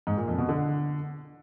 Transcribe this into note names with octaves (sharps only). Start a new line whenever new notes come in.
G#2
A#2
F2
B2
D3